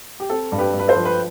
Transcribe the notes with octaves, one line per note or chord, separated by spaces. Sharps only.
G4
C4 A4
G2
G4 B4
G2
B4
A4 C5
F3
B4